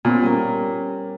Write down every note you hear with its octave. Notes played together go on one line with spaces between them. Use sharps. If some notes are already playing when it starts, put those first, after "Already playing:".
A#2 B3 C#4 C5
G3 C#4 A#4